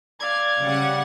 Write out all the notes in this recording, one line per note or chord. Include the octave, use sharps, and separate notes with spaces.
D5 F5 G#6
C#3 G3 F#5